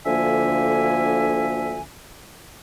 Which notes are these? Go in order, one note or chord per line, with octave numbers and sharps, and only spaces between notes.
D2 D3 F3 A#3 E5 G#5